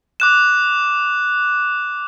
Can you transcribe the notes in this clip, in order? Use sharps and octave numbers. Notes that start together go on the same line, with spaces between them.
D6 F#6 E7